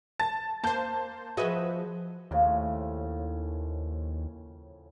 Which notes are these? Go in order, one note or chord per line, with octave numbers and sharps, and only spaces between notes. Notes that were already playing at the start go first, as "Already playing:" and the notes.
A5 A6
A#3 C5 A5 G6
F3 F#4 G#4 B4 D#5 E5
D#2 A2 C#3 F3